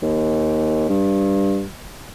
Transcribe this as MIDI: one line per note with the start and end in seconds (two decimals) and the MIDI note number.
0.02 0.88 39
0.89 1.64 43